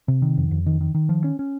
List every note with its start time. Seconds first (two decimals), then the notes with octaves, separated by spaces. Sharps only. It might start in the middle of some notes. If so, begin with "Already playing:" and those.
0.08 C3
0.22 D#3
0.38 F2
0.51 F2
0.66 D#3
0.81 D#3
0.95 D#3
1.09 F3
1.24 C#4
1.39 C#4